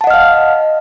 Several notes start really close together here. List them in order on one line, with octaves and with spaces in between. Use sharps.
A5 F#5 D#5 F6 F5